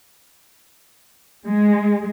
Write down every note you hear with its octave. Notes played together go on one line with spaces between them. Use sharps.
G#3